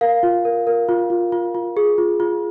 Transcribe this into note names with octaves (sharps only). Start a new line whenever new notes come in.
A#4 F5
F4
A#4
A#4
F4
F4
F4
F4
G#4
F4
F4